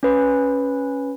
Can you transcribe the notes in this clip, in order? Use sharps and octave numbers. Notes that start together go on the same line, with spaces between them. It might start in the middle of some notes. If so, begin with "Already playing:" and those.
C#4 B4